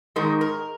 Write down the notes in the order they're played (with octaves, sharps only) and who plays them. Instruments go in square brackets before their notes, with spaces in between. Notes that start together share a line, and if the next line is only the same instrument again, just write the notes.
[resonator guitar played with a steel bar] G#2 D#3 G#3 D#4 A#4
A#4